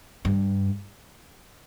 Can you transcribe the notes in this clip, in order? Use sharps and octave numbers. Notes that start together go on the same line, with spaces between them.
G2